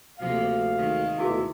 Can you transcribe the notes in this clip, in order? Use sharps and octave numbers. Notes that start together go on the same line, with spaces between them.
D2 C3 F3 A#3 F5
D#3 G#3
D2 B2 E4 F#4 G#4 E5